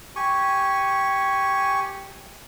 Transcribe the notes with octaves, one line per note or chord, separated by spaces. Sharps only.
G4 G#5 C#6